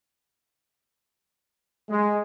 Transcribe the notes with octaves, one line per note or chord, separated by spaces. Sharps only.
G#3